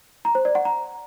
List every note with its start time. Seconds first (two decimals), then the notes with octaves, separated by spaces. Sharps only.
0.25 A#5
0.35 C5
0.45 D5
0.55 F#5
0.65 A#5